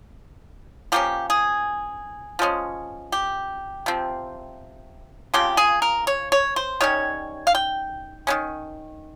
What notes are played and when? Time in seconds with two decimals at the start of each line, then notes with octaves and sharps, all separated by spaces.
0.92 F3 A#3 C#4 G4
1.30 G#4
2.39 F3 G#3 C#4
3.12 G4
3.86 C3 F3 C4
5.34 C#3 F3 C4 G4
5.57 G#4
5.82 A#4
6.07 C#5
6.32 C#5
6.56 C5
6.81 D#3 G3 C#4 C#5
7.47 F5
7.55 G5
8.27 D#3 G#3 C#4